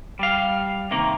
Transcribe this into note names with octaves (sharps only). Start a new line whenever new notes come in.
G3 F5
C3 D#3 A#3